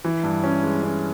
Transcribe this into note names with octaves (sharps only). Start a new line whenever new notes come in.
E3
G2
C#4
G#3
C#4